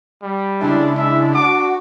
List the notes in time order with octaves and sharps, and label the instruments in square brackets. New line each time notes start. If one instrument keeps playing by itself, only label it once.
[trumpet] G3
[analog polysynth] C#3 G#3 E4 [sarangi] D4
[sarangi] D4 [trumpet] E5
[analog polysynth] F#4 [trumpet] D6